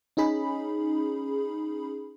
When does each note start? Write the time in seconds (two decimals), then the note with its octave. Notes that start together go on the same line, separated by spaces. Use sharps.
0.17 C#4 D#4 G#4 B5